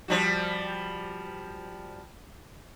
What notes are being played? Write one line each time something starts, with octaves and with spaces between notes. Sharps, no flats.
F3 G3 F#4